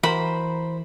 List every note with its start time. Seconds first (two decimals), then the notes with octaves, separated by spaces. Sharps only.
0.03 E3 F#4 A#4 C5 B5